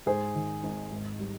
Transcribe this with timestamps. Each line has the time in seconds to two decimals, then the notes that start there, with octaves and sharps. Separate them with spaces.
0.06 G#2 G#4 C5
0.35 D#3
0.63 G#1
0.92 G#2
1.19 G3